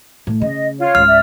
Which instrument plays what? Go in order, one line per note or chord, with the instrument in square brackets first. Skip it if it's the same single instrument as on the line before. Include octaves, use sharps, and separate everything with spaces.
[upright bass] A2
[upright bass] C#3 [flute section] D#5
[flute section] F4 C#5
[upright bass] C#2 G#2 [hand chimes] F6
[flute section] D5 E5